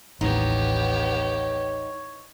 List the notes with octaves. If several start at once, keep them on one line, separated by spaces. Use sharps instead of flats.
A1 D#2 A2 B3 D#4 G4 C#5